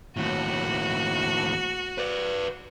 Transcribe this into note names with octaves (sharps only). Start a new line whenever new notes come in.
D#2 A2 F#4
B4 D5